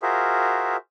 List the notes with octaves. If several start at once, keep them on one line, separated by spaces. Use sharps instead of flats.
F4 F#4 G#4 A#4 C5 E5